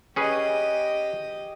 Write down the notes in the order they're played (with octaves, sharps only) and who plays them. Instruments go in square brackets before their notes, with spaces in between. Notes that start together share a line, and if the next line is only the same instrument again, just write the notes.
[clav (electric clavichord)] C#4 G#4 B4 [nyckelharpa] G4 D#5